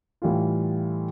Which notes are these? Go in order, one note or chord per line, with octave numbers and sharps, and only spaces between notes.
A2 E3 G3 F4